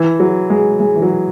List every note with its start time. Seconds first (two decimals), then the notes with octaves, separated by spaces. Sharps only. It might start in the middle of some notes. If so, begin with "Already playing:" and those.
Already playing: E3
0.20 F#3
0.50 G#3
0.80 G#3
0.95 E3
1.02 F#3